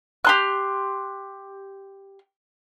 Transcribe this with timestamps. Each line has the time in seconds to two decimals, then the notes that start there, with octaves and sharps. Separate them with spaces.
0.25 G4 C6 F#6